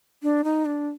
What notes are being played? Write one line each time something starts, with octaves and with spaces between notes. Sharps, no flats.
D4
D#4
D4